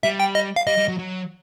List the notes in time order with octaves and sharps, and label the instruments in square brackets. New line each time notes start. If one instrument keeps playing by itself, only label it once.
[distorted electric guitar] G3 [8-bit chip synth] E5
[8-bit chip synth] G5
D#5
F5
[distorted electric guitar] G3 [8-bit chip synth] D#5
[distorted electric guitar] G3
F#3
F#3